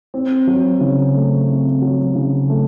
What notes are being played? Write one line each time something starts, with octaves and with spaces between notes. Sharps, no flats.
C4
F#3
C#3
A3
C4
F#3
C#3
A3